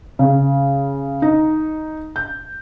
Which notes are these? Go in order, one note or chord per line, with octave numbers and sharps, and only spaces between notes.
C#3
D#4
G6